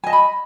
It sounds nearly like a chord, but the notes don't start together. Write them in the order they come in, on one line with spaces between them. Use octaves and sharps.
G#5 D#5 A5 B5